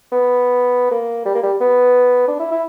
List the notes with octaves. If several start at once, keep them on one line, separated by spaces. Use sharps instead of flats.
B3
A#3
G3
A#3
G3
B3
D4
E4
E4